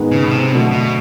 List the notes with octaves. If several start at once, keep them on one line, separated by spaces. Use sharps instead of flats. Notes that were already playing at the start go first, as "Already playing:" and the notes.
Already playing: G#2 D#3 G#3 B3
C#3
B2
C3
B2 D3 F#3 A3
B2